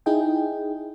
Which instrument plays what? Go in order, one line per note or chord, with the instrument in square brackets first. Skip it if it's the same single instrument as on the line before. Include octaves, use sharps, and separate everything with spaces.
[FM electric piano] D#4 E4 G#4 D#5 G5